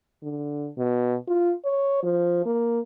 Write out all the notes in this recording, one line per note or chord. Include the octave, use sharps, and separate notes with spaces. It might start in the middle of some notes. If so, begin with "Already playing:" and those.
D3
B2
F4
C#5
F3
A#3